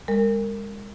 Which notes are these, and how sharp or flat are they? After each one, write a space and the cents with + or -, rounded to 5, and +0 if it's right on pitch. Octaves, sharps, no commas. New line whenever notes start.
G#3 -40 A#4 -20